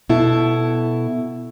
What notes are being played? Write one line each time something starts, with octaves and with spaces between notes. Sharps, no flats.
B2 E4 A4